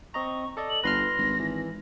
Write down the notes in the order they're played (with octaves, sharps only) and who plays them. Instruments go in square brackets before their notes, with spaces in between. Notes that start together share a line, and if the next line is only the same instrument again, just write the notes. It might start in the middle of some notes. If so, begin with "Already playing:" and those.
[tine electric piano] C4 D#5 A#5 [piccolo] C#6
[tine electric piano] A4 D5 D#5
[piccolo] F#7
[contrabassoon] G1 [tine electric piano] B4 C6 F6 [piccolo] A#6
[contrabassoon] G#1
[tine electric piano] E3